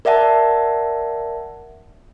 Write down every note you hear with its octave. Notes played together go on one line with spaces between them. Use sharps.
A#4 D5 E5 F#5 A5